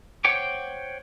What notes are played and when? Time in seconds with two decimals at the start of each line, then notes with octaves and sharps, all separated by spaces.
0.25 C5 C#5 F#5 G5 D6